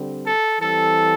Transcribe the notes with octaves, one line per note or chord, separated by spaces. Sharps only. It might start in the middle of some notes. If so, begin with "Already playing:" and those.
Already playing: D3 G3 C4
A4
E3 G3 C4 A4